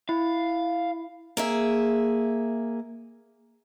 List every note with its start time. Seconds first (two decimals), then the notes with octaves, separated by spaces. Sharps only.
0.09 E4 F5
1.37 A#3 G#4 E5